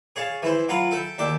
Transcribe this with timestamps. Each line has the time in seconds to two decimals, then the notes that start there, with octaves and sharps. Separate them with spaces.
0.16 G#4 C#5 F5 A5
0.42 E3 E4 C5
0.69 F#3 F4 F5 G#5 B5
0.91 A4 E5 G5
1.18 D#2 D4 E5 G5